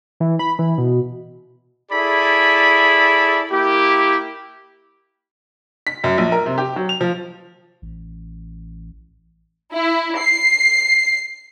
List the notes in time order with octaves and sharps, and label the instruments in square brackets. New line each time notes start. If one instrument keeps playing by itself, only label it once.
[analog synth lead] E3
B5
E3
B2
[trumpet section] E4 G#4 A4 D5 B5
A#3 E4 G4
[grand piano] B6
F#2
A#1
A#4
C3
G4
F#3
F7
F3
[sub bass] A1
[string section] E4
C7